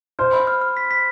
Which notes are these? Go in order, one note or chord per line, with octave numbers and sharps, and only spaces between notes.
C5 F6
B5
F6
F6
B6
B6